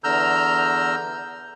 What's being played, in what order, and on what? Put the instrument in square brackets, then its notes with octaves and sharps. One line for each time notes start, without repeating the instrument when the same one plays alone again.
[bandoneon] E2 D3 A#5 E6 F6 G6